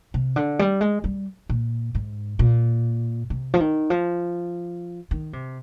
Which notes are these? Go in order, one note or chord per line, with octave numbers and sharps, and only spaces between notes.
C3
D3
G3
G#3
G3
A#2
G#2
A#2
C3
F3
D#3
F3
D#3
C3